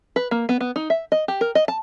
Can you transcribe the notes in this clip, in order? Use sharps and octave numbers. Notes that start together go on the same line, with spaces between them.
B4
A#3
B3
B3
D#4
E5
D#5
G4
A#4
D#5
A5